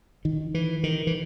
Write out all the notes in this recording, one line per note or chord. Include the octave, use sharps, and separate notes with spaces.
D#3
E3
D#3
E3